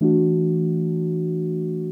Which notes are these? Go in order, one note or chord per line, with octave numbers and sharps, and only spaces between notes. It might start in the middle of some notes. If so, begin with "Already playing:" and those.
E3 A3 D4 F#4